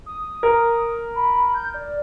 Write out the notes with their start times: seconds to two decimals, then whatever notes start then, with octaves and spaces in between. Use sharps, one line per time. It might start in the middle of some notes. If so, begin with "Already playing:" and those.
0.06 D#6
0.43 A#4
1.15 B5
1.54 G6
1.74 D5